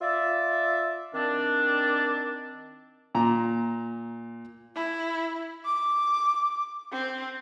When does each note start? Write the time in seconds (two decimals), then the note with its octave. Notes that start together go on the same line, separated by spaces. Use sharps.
0.02 F4 D5 E5
1.14 D#3 C4 D4
3.15 A#2 A#5
4.75 E4
5.65 D6
6.92 C4